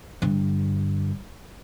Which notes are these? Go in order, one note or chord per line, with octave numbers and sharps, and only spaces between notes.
G2 D3